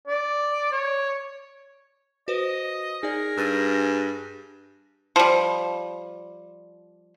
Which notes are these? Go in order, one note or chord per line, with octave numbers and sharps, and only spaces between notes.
D5
C#5
F#4 B4 C5 D#5
D#4 G#4 A#4 D5
G2 E6 A6 D#7
F3 G3